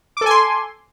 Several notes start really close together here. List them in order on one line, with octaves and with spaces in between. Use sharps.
D6 A4 G#5 C6